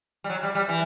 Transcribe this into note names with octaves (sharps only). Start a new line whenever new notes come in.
G3
F#3
G3
G3
E3